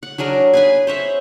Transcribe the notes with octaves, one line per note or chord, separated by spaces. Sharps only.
F#5
F#3 D4 G#4 A#4
G#4 B4 G#5
C5 C#5 E5 F#5